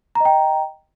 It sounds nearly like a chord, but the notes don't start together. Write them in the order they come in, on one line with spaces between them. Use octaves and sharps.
A#5 D#5 G5